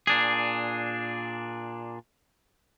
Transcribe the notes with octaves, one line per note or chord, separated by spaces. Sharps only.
A#2 D4 G#4